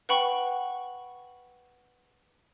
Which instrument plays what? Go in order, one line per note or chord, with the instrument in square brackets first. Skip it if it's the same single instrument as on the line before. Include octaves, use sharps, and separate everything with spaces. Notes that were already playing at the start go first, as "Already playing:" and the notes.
[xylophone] B4 F#5 G5 B5 C#6